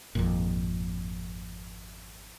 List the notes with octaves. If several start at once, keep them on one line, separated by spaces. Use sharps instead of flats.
G#1 F2 A#2